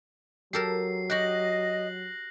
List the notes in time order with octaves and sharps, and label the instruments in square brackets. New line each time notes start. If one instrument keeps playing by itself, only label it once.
[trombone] F#3 [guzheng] G4 A4 A#4 [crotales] C7
[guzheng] F#4 G4 [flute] D#5 [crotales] F#6 A#6 F#7